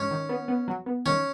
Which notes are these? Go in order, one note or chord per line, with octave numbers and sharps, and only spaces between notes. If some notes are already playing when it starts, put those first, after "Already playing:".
Already playing: G#2 C#4
D#3
B3
B3
F#3
B3
D#3 C#4